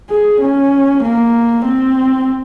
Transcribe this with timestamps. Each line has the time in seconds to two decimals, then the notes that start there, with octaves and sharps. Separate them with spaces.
0.10 G#4
0.41 C#4
1.03 A#3
1.65 C4